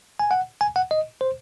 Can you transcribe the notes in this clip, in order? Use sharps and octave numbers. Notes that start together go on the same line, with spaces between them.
G#5
F#5
G#5
F#5
D#5
C5